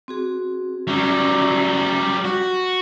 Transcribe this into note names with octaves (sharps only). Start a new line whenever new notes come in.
C4 F#4 G#4
F#3 G3 C#4
F#4